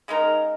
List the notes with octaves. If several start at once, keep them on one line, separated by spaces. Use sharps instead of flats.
C#3 G#3 D#4 A#4